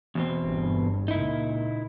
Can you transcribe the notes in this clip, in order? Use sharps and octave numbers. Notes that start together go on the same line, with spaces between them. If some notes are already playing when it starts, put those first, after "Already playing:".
E2 B2 C4
G1 G2
C#2 A#2 D#4 E4